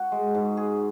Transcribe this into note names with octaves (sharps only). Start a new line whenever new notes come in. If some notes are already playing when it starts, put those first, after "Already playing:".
Already playing: F#4
G#3
G#2
G#4